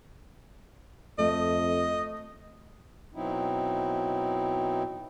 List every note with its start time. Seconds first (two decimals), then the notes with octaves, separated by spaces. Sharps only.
1.18 F2 A3 D#5
3.15 B2 F#3 C4 D#4 E4